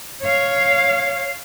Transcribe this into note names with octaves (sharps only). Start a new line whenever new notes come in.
C#5 F5